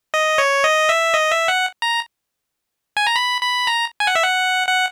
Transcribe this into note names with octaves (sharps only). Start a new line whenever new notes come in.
D#5
C#5
D#5
E5
D#5
E5
F#5
A#5
G#5
A#5
B5
B5
A#5
G#5
F#5
E5
F#5
F#5